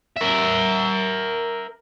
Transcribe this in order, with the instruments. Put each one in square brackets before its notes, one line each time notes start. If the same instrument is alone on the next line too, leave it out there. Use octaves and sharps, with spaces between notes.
[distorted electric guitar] A#4 E5